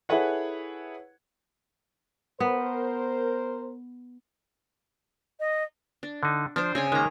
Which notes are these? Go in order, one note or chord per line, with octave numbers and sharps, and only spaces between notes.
E4 G#4 A4 B4 C#5 F#5
B3 A#4 C5
D#5
D4
D3 D#4
F3 D4 C5
C#3 C4 C#5 G#5
D#3 G#3 A#3 A#5